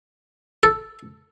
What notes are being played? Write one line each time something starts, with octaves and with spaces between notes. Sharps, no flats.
A4